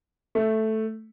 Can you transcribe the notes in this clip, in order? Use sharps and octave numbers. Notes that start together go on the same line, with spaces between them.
A3